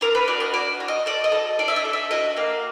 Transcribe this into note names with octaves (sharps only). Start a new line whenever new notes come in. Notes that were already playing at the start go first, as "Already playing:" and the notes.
D4 A#4
B4
F#4 D5
D#5
F#4 D5
F#4
D#5
A4 D5
D#5
A4
D4 D5
E5
D#5
A4
E5
F#4 D#5
A#3 F5